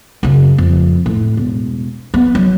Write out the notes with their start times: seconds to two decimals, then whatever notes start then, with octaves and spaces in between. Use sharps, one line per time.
0.23 F#2 C#3
0.58 F2
1.06 A2
1.37 E1
2.14 B3
2.35 F#3